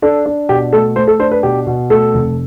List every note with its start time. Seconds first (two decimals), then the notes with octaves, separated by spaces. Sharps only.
0.02 D4 A4
0.26 D4
0.49 B2 G4
0.73 A3 A4
0.96 A3 C5
1.08 A4
1.19 D4 C5
1.31 B4
1.43 B2 G4
1.66 B2
1.90 A3 A4
2.14 F1